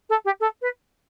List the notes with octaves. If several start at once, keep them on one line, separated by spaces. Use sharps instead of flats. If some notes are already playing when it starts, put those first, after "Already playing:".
A4
G4
A4
B4